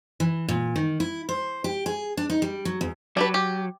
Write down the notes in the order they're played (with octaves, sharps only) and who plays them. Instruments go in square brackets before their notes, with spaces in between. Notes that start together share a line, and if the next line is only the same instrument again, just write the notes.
[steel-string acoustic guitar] E3
A#2
D#3
E4
C5
G4
G#4
D4
D#4
G3
F#3
E2
[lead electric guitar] F#3 [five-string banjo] D4 G4 B4
[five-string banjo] G4